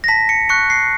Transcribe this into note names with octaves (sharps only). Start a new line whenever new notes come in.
A#6
A5 B6
C#7
C#6 F#6 C#7
C7